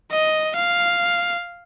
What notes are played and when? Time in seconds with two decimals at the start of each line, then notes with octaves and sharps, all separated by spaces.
0.12 D#5
0.56 F5